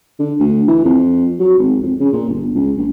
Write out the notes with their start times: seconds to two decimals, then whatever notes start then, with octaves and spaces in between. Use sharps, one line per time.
0.19 D3
0.40 D2
0.68 E3
0.85 F2
1.39 F#3
1.58 G#1
1.82 F2
2.00 C#3
2.13 A#2
2.29 G1
2.54 C#2
2.77 A#1